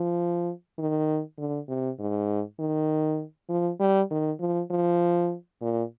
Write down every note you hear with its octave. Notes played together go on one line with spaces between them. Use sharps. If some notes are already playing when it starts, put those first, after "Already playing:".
Already playing: F3
D#3
D3
C3
G#2
D#3
F3
G3
D#3
F3
F3
A#2